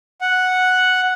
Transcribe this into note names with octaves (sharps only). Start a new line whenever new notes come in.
F#5